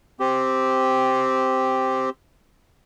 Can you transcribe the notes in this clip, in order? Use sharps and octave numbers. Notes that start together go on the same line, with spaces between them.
C4 G4